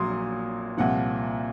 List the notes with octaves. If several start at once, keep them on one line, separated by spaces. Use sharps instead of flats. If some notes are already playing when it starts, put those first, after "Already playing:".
Already playing: A#1 A#2 F#3 C6 D#6
C2 A#2 F3 F#5